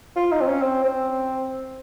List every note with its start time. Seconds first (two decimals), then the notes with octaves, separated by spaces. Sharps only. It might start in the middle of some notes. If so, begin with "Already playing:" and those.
0.16 F4
0.31 D#4
0.41 C4
0.47 C#4
0.62 C4
0.84 C4